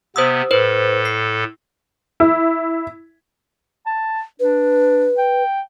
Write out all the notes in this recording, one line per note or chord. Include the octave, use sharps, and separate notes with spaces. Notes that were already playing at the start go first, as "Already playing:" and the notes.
C3 B3 C5 D#6 E6
A2 A4 B4 C5
C7
E4
A5
D4 B4
G5